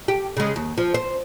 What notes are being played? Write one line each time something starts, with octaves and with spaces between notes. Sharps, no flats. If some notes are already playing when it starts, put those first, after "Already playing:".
G4
C#3 G#3
D#2
F3
C5